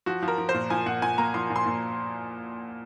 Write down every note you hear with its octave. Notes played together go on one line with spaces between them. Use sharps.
F3 F#4
F3
A#4
F3
C5
A#2
F3 G#5
A#2 F#5
A#2 G#5
A#3 A#5
F3 C6
A#2
C6
A#2